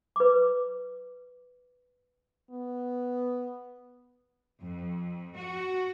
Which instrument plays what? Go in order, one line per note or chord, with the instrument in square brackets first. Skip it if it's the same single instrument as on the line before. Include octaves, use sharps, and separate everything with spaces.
[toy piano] B4 D6
[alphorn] B3
[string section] F2
F#4